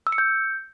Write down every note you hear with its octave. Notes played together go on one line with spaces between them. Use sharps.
E6
C#7
G6